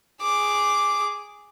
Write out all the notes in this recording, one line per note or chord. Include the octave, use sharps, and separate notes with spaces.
G#4 D6